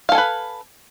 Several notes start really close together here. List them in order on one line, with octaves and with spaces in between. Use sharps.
F5 A4 G#5 B4